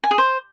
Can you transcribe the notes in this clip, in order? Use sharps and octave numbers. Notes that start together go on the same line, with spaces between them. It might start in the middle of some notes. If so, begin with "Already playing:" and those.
G#5
G#4
C5